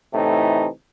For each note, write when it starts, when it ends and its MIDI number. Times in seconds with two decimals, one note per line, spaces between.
0.14 0.67 45
0.14 0.67 48
0.14 0.67 52
0.14 0.67 57
0.14 0.67 63